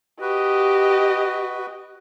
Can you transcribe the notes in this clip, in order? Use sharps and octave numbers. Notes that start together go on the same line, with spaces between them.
F#4 G4 B4 D#5